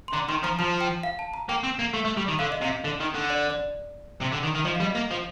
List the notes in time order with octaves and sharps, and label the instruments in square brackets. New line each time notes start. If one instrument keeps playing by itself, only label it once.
[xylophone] C6
[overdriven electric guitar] D3 [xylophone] A#5
[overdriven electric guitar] D#3 [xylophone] C6
[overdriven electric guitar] F3 [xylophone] A#5
[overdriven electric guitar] F3 [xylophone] A5
[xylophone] G5
F5
A5
A#5
[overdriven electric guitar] A#3 [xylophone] G5
[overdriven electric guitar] C4
A#3
A3
A3
G3
D#3
[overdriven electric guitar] D3 [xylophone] F5
[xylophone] D#5
[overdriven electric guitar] C3
[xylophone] F5
[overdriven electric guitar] D3
D#3
D3
[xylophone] D5
D5
[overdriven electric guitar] C3
D3
D#3
D#3
[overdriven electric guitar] F3 [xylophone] D#5
[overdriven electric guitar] G3 [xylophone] F5
[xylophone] D#5
[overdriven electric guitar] A#3
F3